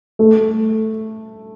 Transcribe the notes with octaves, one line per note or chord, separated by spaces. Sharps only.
A3